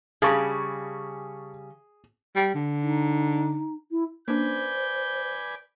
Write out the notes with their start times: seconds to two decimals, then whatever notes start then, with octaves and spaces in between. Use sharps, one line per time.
0.22 C#3 G3 G#4 A5 C#6
2.36 G3
2.55 D3
2.83 D#4
3.91 E4
4.28 A#3 C#4 D4 B4 C5 D5 G#5 G6